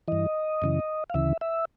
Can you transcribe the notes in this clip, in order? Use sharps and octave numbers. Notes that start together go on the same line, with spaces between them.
G2 E3 D#5
F#2 C#3 E3
F5
D2 C#3 E3 E5
E5